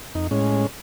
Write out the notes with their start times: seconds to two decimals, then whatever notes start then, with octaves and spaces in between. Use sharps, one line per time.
0.15 F2 D#4
0.31 A2 G#3 C#4